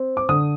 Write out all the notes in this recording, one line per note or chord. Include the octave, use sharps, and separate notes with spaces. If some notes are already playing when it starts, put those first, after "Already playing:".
Already playing: C4
D6
D3 D#6